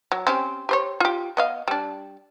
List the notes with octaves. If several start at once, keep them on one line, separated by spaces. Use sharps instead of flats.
F#3
C4 C#4 G4
G4 C5 C#5
F4 G4
B3 D#5 F5
G3 D4